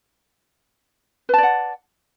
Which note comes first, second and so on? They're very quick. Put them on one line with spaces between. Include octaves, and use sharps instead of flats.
B4 A5 D5 F#5